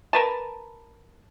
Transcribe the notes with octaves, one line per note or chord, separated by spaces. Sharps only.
A#4 B4 A5